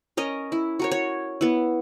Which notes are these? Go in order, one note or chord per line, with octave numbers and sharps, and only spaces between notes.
C#4 A#4 D#5
E4
F#4 A#4 C#5
C#5
B3 E4